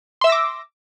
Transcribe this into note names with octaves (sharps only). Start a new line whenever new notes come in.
E5 C6 D6 E6 A#6